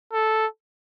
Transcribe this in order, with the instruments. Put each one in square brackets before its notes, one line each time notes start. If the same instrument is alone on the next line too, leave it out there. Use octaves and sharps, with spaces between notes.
[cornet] A4